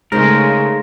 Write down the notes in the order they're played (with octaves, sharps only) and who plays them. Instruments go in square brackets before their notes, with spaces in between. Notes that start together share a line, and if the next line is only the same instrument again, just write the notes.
[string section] C#3 A3 [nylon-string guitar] G#3 D#4 C5 [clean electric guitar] A#4